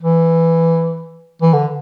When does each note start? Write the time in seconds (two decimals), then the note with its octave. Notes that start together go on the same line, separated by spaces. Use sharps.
0.01 E3
1.42 E3
1.53 D3